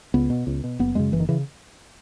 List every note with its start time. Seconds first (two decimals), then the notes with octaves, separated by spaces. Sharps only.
0.14 C#2 B3
0.30 B2
0.47 C#2
0.64 B2
0.79 F#1 B3
0.95 F#2 C#3 G#3
1.12 F#1 E3
1.20 D#3
1.29 C#3 E3